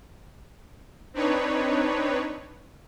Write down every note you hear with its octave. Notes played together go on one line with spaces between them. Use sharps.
C4 D4 D#4 B4 C#5